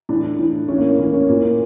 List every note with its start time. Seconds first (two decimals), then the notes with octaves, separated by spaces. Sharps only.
0.09 A2 E3 D4
0.39 A2 E3
0.68 A2 E3 C#4
0.78 A#3
0.88 C#4
0.98 A2 E3 A#3
1.14 C#4
1.29 A#2 A#3